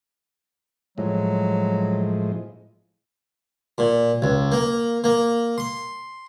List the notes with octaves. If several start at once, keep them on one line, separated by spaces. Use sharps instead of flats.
A2 F3 F#3 G#3
A#2
C#2
A#3
A#3
C6